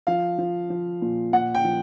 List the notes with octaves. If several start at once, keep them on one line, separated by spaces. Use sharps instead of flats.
F3 F5
F3
F3
A#2
A#2 F#5
G5
F3